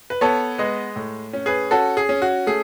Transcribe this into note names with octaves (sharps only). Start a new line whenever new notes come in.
B4
B3 A4 C#5
G#3 B4 D#5
A2
C#4
G#4 B4
C#4 F#4 A4
G#4
C#4
F#4
A3 G#4